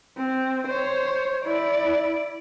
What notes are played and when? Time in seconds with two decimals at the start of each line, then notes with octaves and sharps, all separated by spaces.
0.17 C4
0.67 C5 C#5
1.44 E4 D5